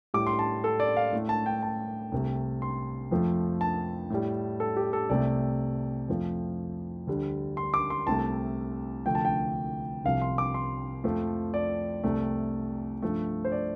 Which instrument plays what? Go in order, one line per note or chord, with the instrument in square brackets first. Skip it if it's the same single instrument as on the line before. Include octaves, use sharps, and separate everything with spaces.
[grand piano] A2 G3 D6
C6
A5
A4
D5
F5
A2 A3
A5
G5
A5
C2 C3 A3
C6
F2 F3 A3
A5
A2 G3
A4
G4
A4
C2 C3 A3 D5
F2 F3 A3
D2 D3 G3
C6
D6
C6
C2 C3 A3 A5
D2 C3 F3 A3 G5
A5
G5
C2 C3 F3 F5
C6
D6
C6
F2 F3 A3
D5
C2 C3 A3
G2 F3 A3
C5
D5